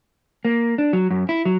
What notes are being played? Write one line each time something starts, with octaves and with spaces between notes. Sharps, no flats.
A#3
D4
F#3
F#2
E4
F#3